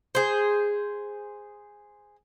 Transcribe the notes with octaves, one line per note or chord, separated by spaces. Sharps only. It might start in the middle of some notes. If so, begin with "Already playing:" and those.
G#4 C5